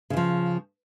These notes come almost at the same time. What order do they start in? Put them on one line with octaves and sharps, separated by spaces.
C#3 E3 F3